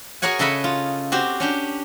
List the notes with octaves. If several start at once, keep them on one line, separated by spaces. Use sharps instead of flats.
F#4 G#4 A#4 C#5 F#5 G#5
C#3 A4 D#5 E5 F#5 B5
F4
C4 F#4 G4
C#4 D4 G4